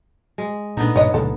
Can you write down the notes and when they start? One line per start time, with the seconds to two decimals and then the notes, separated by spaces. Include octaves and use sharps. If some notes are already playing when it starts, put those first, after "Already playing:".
0.38 G#3
0.77 A#2 D3 B3 D#4
0.96 G2 A#2 C#3 C#5 D#5
1.14 C#2 A#2 F3 A4